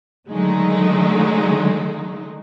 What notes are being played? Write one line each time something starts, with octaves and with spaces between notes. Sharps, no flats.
D3 D#3 F#3 G#3 A3 D#4